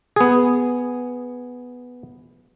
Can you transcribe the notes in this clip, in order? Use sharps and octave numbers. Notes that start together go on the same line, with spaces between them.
B3 G#4